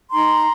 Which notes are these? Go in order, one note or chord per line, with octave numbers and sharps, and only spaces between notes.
D#4 A#5 C6